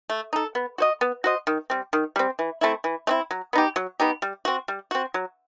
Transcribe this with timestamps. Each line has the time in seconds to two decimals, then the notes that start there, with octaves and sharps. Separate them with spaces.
0.10 A3
0.33 D#4 A4
0.55 B3
0.78 F#4 C5 D#5
1.01 B3
1.24 F#4 C5 D#5
1.47 D#3
1.70 G3 C4
1.93 D#3
2.16 G3 C4
2.39 E3
2.61 A3 C4 E4
2.84 E3
3.07 A3 C4 E4
3.31 F#3
3.53 B3 D#4 G4
3.76 F#3
4.00 B3 D#4 G4
4.22 G3
4.45 C4 F#4
4.68 G3
4.91 C4 F#4
5.14 F#3